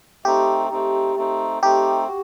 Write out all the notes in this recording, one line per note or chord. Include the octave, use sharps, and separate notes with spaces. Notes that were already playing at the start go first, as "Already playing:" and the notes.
A3 C4 D#4 G4
A3 C4 D#4
A3 C4 D#4
A3 C4 D#4 G4
F#4